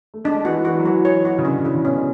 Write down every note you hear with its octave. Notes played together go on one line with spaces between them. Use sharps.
A3
G#3 D4
E3 F#4
E3 F#4
F#3
E3 F#4
C#5
F#4
C#3
D3 C#4
C#3
D3 E4
C#3
B2 C#4